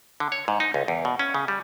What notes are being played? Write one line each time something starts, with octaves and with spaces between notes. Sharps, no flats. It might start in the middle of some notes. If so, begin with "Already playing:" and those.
D3
C#5
G#2
D#4
C#2
E2
B2
C#4
C#3
G3